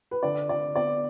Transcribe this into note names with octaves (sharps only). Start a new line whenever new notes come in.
B4
D3 D5
D3 D5
B3 D5